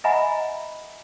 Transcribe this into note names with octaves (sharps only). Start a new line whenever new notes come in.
D#5 E5 F#5 G#5 A#5 B5